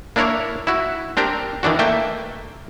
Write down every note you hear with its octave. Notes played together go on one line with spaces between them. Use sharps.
A#3 D4 E4 A#4 C#5
E4 F#4
C4 D4 G4 A#4
D#3 E3 D4 F#4
A3 A#3 E5 G5